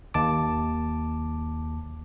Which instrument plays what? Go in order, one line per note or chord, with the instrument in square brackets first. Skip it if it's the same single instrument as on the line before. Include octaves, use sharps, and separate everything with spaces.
[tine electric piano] D#2 A5 D6